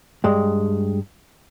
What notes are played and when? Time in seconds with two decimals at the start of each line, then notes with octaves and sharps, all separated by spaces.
0.24 G2 G#3